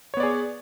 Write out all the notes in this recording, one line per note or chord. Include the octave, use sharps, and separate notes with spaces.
B3 G#4 C#5 D5